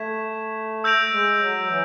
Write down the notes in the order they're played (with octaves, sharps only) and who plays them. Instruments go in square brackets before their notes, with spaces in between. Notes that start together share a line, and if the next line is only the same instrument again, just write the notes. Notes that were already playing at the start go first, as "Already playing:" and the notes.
Already playing: [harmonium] A3 [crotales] G#6 B6 E7
[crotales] E6 G6 A#6 D7 F7
[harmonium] G#3
F#3
E3